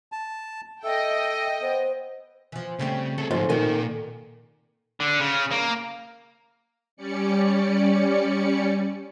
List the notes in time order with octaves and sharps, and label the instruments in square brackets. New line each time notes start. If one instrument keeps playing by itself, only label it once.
[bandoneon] A5
[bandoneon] A4 [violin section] D#5 G5 [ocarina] E5
[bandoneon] B3 [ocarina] C5
[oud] E3 F3
[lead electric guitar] C#3 [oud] G3 A3 C4
[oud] A3 [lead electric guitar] G#4 A4
[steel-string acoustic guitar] G#2 [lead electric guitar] F3 G#3 [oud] A4
[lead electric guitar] A#2 G#5 [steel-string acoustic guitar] D#3
[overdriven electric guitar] D3
C#3
A#3
[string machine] G3 C#4 D5 C#7